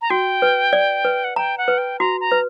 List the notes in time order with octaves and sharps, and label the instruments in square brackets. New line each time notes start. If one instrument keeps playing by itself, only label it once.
[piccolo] A#5
[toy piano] F#4 [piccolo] G5
[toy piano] B4
D5
B4
[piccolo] F#5
[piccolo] G5 [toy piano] A#5
[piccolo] F#5
[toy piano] B4
[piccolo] G5
[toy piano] F#4 [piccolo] A#5
[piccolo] A#5
[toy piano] B4